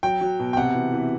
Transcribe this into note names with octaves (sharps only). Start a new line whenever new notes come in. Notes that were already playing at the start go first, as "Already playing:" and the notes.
F#3 G5
F#3
B2
G5
C3 F#5
E3
E3